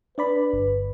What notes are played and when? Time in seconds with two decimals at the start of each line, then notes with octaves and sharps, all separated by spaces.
0.18 D4 B4 D5 B5
0.53 G1